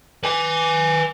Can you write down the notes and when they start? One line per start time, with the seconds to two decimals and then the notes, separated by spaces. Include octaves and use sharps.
0.24 B4 G#5